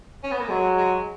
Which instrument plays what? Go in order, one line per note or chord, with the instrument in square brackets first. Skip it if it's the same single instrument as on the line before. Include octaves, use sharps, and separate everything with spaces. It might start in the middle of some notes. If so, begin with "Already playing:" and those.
[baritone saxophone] C#4
B3
A#3
[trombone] F#3 [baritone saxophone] G#3
[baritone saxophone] G#3